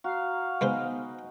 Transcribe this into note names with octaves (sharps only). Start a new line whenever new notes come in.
F#4 F5 A#5
G#3 B3 D#4 B4 C5 G#5